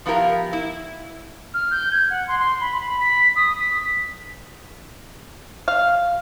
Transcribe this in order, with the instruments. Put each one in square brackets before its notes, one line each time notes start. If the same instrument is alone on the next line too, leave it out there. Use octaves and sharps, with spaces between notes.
[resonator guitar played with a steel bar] F3 B3 E4 G4 A#4 F5
E4
[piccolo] F6
G6
G#6
F#5
C6
C6
B5
B5
B6
D#6
B6
[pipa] F5